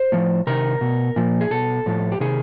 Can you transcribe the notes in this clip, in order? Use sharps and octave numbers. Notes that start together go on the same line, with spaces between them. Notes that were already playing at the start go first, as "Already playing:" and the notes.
Already playing: C5
A2 F3
C3 D#3 A#4
B2
A#2 F3
G#4
B2 A4
A2 F3
G4
C3 D#3 G#4